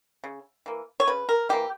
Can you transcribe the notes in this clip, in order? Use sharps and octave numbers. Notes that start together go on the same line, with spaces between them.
C#3
E3 A#3
C#5
C#3 B4
A#4
E3 A#3 G4